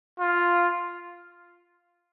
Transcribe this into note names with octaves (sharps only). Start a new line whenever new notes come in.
F4